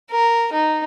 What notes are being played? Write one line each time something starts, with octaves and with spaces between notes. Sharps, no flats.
A#4
D#4